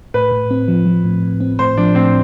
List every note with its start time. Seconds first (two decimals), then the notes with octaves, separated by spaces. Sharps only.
0.14 A2 B4
0.31 A2
0.51 C4
0.68 F3
0.86 F3
1.04 A2
1.23 A2
1.40 C4
1.59 A2 C5
1.77 F3 D4
1.95 A2 C4